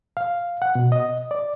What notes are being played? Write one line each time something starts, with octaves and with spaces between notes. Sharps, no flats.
F5
F#5
B2
D#5
D5